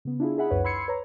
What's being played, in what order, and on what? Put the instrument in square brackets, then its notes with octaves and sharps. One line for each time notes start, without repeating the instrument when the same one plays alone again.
[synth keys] C#3 B3
D4 E4 F4 G#4
D#4 G#4 E5 F#5 B5
C#2 F#2 B4 C#5 F#5
B5 C6 E6 G#6 C7 C#7
B4 C#5 A#5